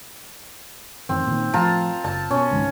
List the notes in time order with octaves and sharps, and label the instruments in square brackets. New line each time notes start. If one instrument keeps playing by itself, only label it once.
[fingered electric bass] A1 F#2 D#3 [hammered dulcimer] C4
[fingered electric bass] A#2 D#3
[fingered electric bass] A2 F3 [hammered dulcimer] F4 A5 A#5
[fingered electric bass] F#1 [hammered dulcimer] A5
[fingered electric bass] B2 [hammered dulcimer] C#4
[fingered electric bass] C#2 G#2 D#3